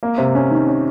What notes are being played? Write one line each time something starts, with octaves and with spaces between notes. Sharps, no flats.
A#3
C3
C#4
D#3
C#4